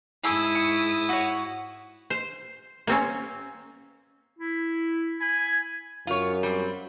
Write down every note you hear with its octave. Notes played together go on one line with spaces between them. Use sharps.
G#2 E4 G#4 A4 D#6 E6
C#6
F#4 C#5
C5
A#3 C4 C#4
E4
G#5 B5
F#2 F4 C#5
G3 C4